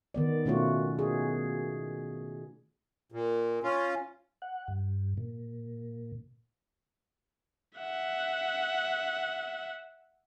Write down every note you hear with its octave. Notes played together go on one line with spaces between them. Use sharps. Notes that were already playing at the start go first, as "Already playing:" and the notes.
D#3 B3 D5
B2 A3 C#4 F4 F#4
G#4
A#2
C#4 F4
F#5
G2
A#2
E5 F#5